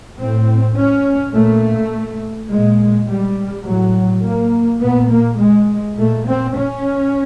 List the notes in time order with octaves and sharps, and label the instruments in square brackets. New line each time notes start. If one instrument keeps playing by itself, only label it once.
[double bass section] A2 C4
C#4
A#2 A3
A#2 G#3
G3
A2 F#3
A#3
A#2 B3
A#3
G#3
A#2 A3
C4
C#4